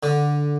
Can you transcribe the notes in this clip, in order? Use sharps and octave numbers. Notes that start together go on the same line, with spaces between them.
D3